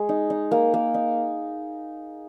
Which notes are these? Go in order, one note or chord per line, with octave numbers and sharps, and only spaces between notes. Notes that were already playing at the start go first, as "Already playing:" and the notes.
Already playing: G#3 G#4
D#4
D#4
A#3
A#3
D#4